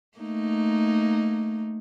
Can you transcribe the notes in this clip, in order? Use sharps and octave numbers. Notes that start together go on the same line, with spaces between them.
A3 A#3 D#4